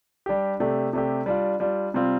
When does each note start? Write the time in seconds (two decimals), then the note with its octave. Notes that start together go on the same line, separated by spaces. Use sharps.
0.26 G3 D4 G4
0.60 C3 A3 D4 G4
0.93 C3 A3 D4 G4
1.26 G3 D4 F4
1.60 G3 D4 F4
1.94 C3 G3 C4 F4